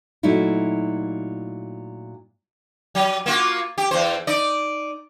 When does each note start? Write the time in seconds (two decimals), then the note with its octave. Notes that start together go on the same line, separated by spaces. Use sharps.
0.23 A#2 F#3 A3 D#4 E4
2.95 F#3
3.26 A#3 F4 F#4
3.78 G4
3.91 E2 C5
4.27 D#4 D5